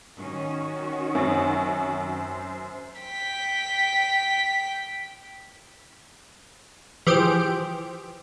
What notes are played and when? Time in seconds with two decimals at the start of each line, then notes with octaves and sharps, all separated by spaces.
0.18 D#3 C#4 F#4
1.15 F#2 C4
2.05 C5
3.01 G5 B6
7.07 E3 F3 G4 G#4 C5 D7